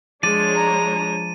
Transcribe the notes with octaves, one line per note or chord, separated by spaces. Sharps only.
F3 G#3 D4 C#5 D5 D#7
A#5